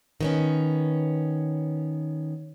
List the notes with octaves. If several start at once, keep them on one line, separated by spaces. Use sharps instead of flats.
D#3 B3 C#4